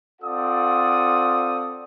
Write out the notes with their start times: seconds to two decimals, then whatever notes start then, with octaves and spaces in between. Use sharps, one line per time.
0.22 C4 F4 A4 D5 F#5 D#6